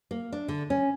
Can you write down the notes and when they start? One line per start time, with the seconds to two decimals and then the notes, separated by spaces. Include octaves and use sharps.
0.11 A#3
0.32 D4
0.48 D3
0.70 C#4